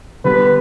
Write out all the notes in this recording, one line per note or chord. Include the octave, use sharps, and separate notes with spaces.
D3 G3 B3 D4 B4